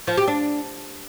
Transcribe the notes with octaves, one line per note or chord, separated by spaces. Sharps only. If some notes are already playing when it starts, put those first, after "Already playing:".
F3
G4
D4